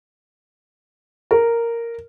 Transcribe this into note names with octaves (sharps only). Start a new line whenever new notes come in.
A#4